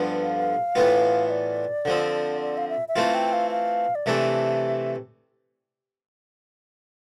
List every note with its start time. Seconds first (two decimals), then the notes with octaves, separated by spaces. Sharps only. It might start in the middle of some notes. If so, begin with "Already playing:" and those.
Already playing: G2 D3 F3 B3 F4
0.20 F5
0.75 A2 E3 B3 F4
1.26 E5
1.31 D5
1.85 D3 F3 C4
2.41 D5
2.57 F5
2.69 E5
2.88 E5
2.96 E3 A3 C4 F4 F5
3.14 G5
3.33 F5
3.51 F5
3.95 D5
4.06 C3 E3 A3 D4 E5